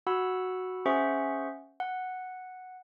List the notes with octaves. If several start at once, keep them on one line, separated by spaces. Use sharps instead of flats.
F#4 F#5 B5 E6
C#4 G#4 C5 E5 F#5 C#6
F#5